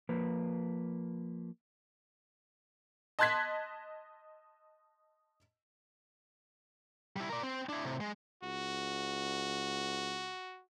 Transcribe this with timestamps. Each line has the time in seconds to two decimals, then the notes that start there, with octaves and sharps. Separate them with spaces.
0.09 F3 A#3 B4
3.19 D#5 A5 C6 F#6 G#6 B6
7.16 G3 E4
7.29 A#4 D5
7.43 C4
7.69 D4 E4
7.84 A2 C3
8.00 G#3
8.43 C#2 F#4